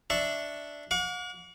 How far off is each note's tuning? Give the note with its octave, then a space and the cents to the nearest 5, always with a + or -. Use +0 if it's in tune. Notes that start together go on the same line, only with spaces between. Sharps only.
D4 +0 E5 +0 C#6 +0
F#5 -45 D6 -45